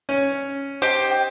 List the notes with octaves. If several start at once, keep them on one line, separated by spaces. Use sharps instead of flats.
C#4
G4 C5 D#5